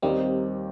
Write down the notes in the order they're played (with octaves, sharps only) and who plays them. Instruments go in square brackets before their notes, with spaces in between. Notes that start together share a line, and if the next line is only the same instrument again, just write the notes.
[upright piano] D#2 D#3 A#3 G4 [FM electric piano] G3 C4